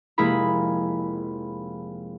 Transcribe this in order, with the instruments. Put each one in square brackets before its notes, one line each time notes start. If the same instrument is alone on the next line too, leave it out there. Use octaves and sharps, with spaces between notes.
[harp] F1 G#3 A#3 E4 G#4 B5